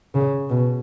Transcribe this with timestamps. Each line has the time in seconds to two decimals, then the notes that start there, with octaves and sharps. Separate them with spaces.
0.14 C#3
0.50 B2